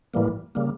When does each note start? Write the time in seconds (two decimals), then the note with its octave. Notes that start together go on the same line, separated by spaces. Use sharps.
0.14 A2 E3 G3 A#3
0.55 C#3 G3 A#3